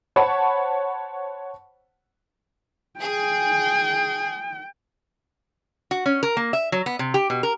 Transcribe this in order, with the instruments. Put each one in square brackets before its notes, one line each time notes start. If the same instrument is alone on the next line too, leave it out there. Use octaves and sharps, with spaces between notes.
[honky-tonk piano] C5 C#5 F#5 A5 B5 C#6
[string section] G#4 [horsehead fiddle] G5
[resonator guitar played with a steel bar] F#4
C#4
A#4
A#3
E5
F#3
B3
C3
G4
B2
A#4